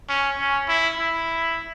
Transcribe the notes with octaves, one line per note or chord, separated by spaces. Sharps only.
C#4
C#4
E4
E4